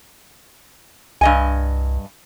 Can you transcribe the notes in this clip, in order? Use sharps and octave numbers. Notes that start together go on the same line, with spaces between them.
C2 G2 D#5 G#5